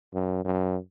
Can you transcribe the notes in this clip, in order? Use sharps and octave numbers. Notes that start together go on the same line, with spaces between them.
F#2
F#2